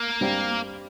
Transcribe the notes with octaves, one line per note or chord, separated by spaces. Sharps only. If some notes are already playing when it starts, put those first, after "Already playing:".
Already playing: A#3
G2 G3 C4 G4